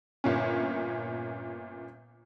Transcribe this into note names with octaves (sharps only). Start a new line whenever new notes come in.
G1 A#2 C#4